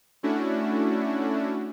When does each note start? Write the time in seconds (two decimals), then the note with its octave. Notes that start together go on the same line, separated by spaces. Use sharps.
0.23 A3 C#4 D4 E4 F#4